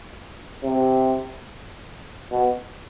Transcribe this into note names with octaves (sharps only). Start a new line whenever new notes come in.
C3
B2